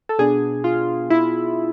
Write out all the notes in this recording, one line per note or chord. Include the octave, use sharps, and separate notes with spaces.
A4
B2 B3 D4 G#4
F4
E4